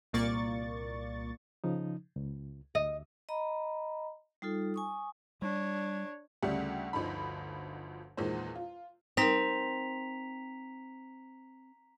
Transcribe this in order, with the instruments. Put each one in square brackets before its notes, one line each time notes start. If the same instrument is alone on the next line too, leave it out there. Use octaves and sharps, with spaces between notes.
[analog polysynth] C2 A#2 A#3 D5 C#6 A6
[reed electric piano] C#3 F3 D#4
C#2
[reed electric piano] D2 [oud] D#5
[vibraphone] D#5 A#5 B5
G3 D#4 F4 A4
G#5 C#6 D#6
[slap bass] G3 [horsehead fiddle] D4 C#5
[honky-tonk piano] D2 C#3 G3 A3 G4 F#5
G1 D2 F3 D#4 B5
E2 A#2 D#3 G#3 C5
F4
[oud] C4 [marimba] D#4 A#4 [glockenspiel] A#5 B6 F7